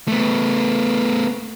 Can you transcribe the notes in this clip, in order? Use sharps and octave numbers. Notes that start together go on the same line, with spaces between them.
A3 B3